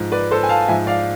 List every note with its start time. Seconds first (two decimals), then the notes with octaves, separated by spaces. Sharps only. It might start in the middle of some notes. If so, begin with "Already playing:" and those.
Already playing: G#2 F3
0.12 B4 D5
0.31 A4 C5
0.43 G#5
0.49 F5 A5
0.68 G#2 F3 E5 G#5
0.87 D5 F5